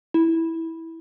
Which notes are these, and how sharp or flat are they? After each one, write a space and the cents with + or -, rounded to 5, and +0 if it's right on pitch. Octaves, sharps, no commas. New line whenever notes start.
E4 -10